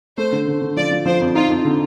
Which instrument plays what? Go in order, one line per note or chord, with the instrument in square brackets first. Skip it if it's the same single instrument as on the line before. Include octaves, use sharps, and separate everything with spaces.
[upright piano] A3 [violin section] C5
[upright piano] D3
D3
D3
[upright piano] F3 [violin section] D5
[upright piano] F3
[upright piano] F3 [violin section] C5
[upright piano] F2
[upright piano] D#4 [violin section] F4
[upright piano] F2
D3